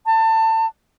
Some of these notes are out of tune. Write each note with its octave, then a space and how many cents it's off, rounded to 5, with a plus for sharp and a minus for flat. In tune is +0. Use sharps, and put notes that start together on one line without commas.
A5 +25